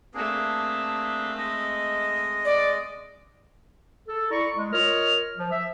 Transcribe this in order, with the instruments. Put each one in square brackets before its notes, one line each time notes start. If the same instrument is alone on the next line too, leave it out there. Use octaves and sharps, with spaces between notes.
[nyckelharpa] A3 C4 [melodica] A#3 D4 G#4
[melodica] G#3 D#5
[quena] D5
[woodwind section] A4
E4 D5 A#5 C#6
G#3
F4 A#4 C#5 D#5 F6
F3
E5